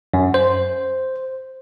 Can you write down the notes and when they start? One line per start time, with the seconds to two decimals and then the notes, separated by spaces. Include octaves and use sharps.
0.14 F#2
0.34 C5